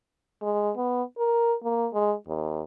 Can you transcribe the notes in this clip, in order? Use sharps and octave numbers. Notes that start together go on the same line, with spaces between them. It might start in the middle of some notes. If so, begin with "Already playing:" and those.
G#3
B3
A#4
A#3
G#3
D#2